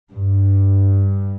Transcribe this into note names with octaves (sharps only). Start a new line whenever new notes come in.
G2